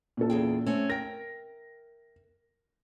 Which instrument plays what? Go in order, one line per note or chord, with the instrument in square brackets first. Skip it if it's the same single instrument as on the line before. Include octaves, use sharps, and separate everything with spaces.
[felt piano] A#2 C#4 A4
[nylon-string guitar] E2 G#4 G5
A3 C4 C#4
[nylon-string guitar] A#4 G5 [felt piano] A#6